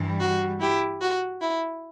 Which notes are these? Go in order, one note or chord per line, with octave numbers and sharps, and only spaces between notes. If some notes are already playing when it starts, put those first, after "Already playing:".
Already playing: G2 E3 G3
F#4
E4 G4
F#4
E4